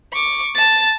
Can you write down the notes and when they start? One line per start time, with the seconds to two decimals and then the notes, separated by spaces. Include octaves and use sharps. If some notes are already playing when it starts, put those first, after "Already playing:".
0.13 C#6 D6
0.55 A5 A6